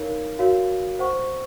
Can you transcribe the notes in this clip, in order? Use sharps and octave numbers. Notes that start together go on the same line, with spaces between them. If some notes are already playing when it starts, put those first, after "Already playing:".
Already playing: D#4 A#4 C#5 F5
F#4 A#4 C#5 F5
C5 F#5 C#6